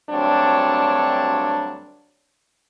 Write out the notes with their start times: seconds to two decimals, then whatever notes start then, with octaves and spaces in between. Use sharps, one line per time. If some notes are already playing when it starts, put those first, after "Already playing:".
0.10 D2 G2 F#3 C4 D4 C#5